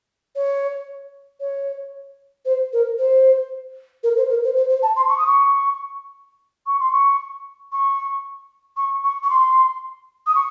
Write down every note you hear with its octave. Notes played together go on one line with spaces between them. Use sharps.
C#5
C#5
C5
A#4
C5
A#4
C5
A#4
C5
C5
C5
A5
C6
C#6
D#6
C#6
C#6
C6
C#6
C#6
C#6
C#6
C#6
C6
D#6
C#6